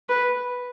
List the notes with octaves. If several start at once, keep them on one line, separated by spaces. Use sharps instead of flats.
B4